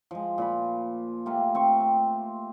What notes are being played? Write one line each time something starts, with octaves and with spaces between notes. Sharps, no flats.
F3 G#3
A#2 F4 B5
A3 A#3 F4 G4
C4 C6 C#6
C4